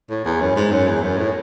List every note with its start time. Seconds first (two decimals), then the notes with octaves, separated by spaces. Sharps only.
0.10 A2
0.25 E2
0.41 F#2
0.56 G#2
0.72 F#2
0.88 E2
1.03 F#2
1.18 A2